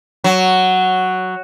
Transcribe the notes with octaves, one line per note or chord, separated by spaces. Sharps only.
F#3